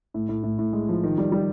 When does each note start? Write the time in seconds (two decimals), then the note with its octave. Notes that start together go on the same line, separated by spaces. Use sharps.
0.14 A2
0.29 A2
0.43 A2
0.59 A2
0.73 G#3
0.89 F3
1.04 D#3
1.18 G3
1.32 G3